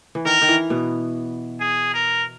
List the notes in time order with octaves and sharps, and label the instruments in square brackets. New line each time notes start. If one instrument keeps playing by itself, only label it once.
[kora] E3
[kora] D#3 [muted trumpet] A#4
[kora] D#3
E3
B2 B3
[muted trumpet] G#4
A#4